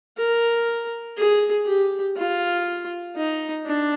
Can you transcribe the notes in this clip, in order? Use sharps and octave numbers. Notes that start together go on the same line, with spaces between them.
A#4
G#4
G4
F4
D#4
D4